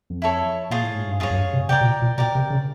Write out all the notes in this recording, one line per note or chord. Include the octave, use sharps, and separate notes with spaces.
F2
E4 A4 C#5
A#2 F4 G#4 C#5
A2
G#2
G2
F#2 F4 G#4 C#5
F#2
G2
C3
C3 A#4 D5 G5
B2
A#2
A#2
B2 A#4 D5 G5
C3
C#3